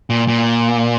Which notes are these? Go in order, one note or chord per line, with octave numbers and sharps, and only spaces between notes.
A#2
A#2